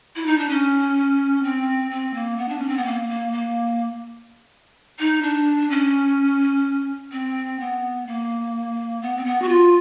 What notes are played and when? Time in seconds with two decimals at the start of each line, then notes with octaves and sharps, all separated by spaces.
0.16 E4
0.26 D#4
0.38 D4
0.49 C#4
1.43 C4
1.91 C4
2.14 A#3
2.38 B3
2.48 D4
2.58 C#4
2.68 C4
2.77 B3
2.85 A#3
3.09 A#3
3.33 A#3
4.99 D#4
5.22 D4
5.70 C#4
7.12 C4
7.60 B3
8.07 A#3
9.02 B3
9.17 C4
9.25 B3
9.42 F#4
9.49 F4